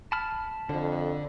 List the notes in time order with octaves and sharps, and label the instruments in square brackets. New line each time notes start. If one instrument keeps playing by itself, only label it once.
[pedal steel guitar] A5 B5 F6
[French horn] F2 [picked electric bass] D3